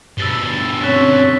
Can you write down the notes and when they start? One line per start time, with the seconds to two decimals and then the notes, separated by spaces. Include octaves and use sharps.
0.18 G2 B2 E6 A6 G7
0.84 C4 C#4 C#5 E6 F#6 B6